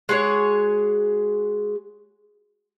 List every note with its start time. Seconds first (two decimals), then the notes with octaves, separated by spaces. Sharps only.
0.09 G#3 F#4 G#4 C#5